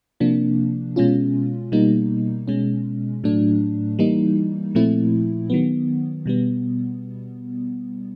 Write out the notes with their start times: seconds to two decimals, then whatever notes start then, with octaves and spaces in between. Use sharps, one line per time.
0.20 C3 F3 A#3 D4
0.96 B2 G#3 C#4 F4
1.72 B2 G3 A#3 D#4
2.48 B2 G#3 C#4
3.24 A2 F#3 A3 D4
3.99 E3 G3 A#3 D#4
4.75 A#2 F3 A3 C4 E4
5.50 D#3 F#3 B3
6.26 B2 G3 B3